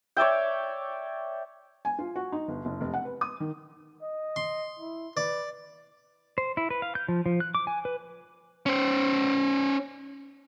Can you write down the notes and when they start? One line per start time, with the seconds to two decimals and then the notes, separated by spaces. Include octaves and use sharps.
0.17 C#5 D5 E5 G5
1.85 G#5
1.99 F4
2.16 F#4
2.32 D#4
2.48 G1
2.65 F#1
2.81 F1
2.94 F#5
3.05 B4
3.21 D#6
3.40 D#3
4.02 D#5
4.36 C6
4.80 E4
5.17 B4 D5
6.38 C5
6.57 E4
6.70 B4
6.82 F5
6.95 G6
7.08 F3
7.26 F3
7.40 F#6
7.55 D6
7.67 G#5
7.85 B4
8.66 C#4 C5